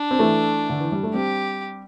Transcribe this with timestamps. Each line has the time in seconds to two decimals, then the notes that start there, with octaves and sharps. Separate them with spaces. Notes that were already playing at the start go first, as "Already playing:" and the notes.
Already playing: D4
0.11 C4
0.19 E3 A3
0.70 D3
0.80 E3
0.92 G3
1.03 A3
1.14 G3 C4 G4